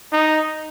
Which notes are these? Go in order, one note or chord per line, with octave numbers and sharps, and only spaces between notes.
D#4